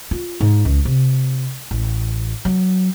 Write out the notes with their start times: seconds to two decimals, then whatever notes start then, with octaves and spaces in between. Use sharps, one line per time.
0.11 F4
0.41 G#2
0.65 C#2
0.85 C3
1.71 A1
2.45 F#3